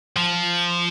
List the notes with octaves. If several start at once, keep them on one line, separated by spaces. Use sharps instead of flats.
F3